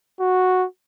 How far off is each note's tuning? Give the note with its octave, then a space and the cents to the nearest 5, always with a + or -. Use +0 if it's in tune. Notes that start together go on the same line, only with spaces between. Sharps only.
F#4 -5